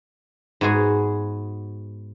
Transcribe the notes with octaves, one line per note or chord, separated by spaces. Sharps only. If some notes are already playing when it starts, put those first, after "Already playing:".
G#2 B3 F#4 G#4 G#5